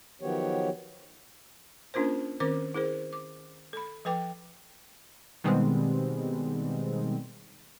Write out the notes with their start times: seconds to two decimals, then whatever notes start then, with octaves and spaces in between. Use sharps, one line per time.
0.22 D#3 F3 F#3 B3 G4 C#5
1.94 A#3 C#4 D4 F4 A#4 C5
2.40 D#3 C4 C#4 A#4 C5 D6
2.74 E4 G#4 A#4 C5
3.13 D6
3.73 A4 B5
4.05 F3 A4 B4 G5 D6
5.44 B2 D#3 G3 G#3 B3 C4